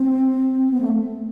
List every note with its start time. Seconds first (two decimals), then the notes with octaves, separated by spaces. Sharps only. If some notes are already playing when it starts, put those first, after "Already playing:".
Already playing: C4
0.71 B3
0.81 A3